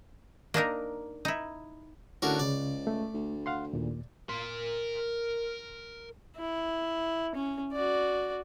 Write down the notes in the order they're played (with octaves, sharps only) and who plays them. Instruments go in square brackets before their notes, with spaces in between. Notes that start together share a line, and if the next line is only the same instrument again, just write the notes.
[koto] A#3 D4 D#4 A#4
D#4 E4
[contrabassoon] A2 [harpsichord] D3 F#4 A#4 [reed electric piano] C#4 D4
[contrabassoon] C#2 [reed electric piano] C#3 C#5 [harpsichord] D5
[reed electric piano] A3
[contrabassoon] D2
[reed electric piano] F5 F#5 C6
D#2 A#2
[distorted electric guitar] A#4 C6
[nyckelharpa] E4
C#4
F#4 D5